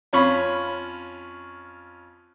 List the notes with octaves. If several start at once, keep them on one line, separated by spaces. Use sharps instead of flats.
F2 C#4 F4 B5 C#6